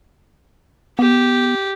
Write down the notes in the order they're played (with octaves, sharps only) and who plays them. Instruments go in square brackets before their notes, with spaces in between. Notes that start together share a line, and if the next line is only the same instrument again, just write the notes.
[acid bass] B3 [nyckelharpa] G4